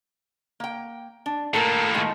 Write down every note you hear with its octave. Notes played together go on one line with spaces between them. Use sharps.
A#3 G5
D4
A2 A#3 A4 A#4
D#3 F3 G#3